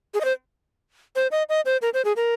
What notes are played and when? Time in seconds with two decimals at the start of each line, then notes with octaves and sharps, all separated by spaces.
0.14 G#4
0.21 D#5
0.25 C5
1.16 C5
1.31 D#5
1.49 D#5
1.65 C5
1.82 A#4
1.94 C5
2.05 G#4
2.16 A#4